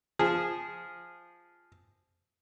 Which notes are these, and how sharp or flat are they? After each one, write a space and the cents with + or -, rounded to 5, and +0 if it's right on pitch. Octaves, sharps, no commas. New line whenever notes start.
F3 +0 G#4 -15